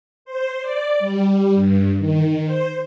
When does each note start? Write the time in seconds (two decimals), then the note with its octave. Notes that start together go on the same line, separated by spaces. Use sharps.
0.25 C5
0.62 D5
0.99 G3
1.54 G2
1.99 D#3
2.46 C5